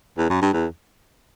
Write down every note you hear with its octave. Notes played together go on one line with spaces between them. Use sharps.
E2
F#2
G2
E2